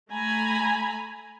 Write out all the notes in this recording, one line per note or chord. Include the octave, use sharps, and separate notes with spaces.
A3 G#5 A#5 B5